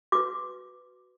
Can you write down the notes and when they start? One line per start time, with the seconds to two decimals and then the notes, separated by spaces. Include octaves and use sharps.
0.12 F#4 B4 D6